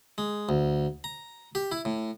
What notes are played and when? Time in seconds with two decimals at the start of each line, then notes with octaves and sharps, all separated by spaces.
0.18 G#3
0.49 D2
1.04 A#5
1.55 G4
1.72 E4
1.85 A2